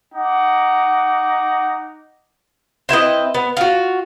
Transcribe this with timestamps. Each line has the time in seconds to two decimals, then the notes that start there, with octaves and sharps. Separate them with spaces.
0.14 D#4 F#5 D6
2.89 C4 E4 B4 D#5
3.34 B3
3.57 F4 F#4